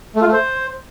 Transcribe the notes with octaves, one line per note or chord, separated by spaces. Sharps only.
A3
F4
A3
C5